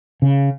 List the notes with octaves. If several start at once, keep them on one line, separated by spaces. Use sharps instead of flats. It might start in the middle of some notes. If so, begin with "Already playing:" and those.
C#3